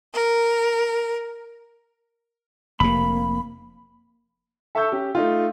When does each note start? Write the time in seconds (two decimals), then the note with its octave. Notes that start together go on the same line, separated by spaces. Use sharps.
0.14 A#4
2.80 F1 C3 A#3 B5
4.75 A4 E5 A5 C#6 E6 G6
4.92 C#4 G4
5.15 A3 D#4 F4